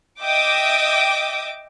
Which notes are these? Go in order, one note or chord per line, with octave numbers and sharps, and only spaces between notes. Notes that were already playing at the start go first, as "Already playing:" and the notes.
D#5 E5 G5 D6 D#6